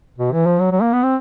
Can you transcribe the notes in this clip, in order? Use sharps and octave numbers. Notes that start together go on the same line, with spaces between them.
B2
E3
F3
F#3
F#3
A#3
B3
C4